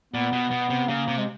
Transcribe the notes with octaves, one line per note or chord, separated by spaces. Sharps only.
A#2 B3
B2
B2
C3
C#3 A#3
C3
G#3